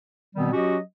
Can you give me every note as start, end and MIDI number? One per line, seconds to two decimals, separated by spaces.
0.36 0.48 47
0.36 0.48 51
0.36 0.48 55
0.36 0.48 59
0.36 0.48 60
0.53 0.77 54
0.53 0.77 61
0.53 0.77 66
0.53 0.77 67
0.53 0.77 75